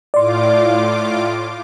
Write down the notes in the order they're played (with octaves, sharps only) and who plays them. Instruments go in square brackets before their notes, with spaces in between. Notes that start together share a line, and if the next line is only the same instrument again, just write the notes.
[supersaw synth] A2 F4 D6 [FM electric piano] D5 C6